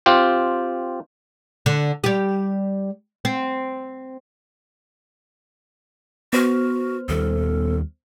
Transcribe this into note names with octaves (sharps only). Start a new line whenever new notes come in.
C4 F4 G4
D3 D4
G3 G4
C4
B3 F#4 C5 F6
D#2 D#3 G3 A4